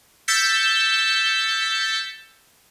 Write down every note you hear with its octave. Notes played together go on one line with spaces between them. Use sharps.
E6 G6 A6 B6 C#7